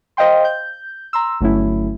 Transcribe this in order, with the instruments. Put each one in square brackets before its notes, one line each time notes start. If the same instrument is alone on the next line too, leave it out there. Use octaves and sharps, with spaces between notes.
[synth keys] C5 D#5 F5 G5 C6
G6
A#5 C6 E6
G1 F#3 A3 C#4 E4